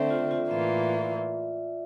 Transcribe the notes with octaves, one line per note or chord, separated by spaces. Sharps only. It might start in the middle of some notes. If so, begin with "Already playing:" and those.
Already playing: D3 A3 C4 D5 E5
F4
F4
A2 E3 A#3 F4 E5